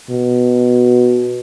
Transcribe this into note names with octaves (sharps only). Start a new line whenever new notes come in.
B2